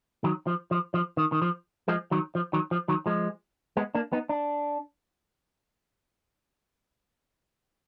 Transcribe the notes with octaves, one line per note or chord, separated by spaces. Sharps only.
D#3 F#3
F3
F3
F3
D#3
D#3
F3
F3 G#3
D#3 F#3
F3
D#3 F#3
F3
D#3 F#3
F3 G#3
G#3 B3
A#3 D4
B3 D#4
D4